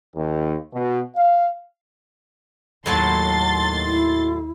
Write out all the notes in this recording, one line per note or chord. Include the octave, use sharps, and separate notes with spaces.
D#2
B2
F5
D#2 A2 F#3 F#5 A5 C6 A6
E4